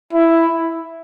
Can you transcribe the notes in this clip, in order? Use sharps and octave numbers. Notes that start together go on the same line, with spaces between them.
E4